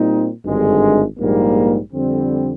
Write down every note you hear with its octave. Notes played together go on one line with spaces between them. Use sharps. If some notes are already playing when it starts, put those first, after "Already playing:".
Already playing: A#2 G3 C4 D#4
G#1 G2 D3 G#3
A#1 G#2 G3 A#3
F2 D3 G3 C4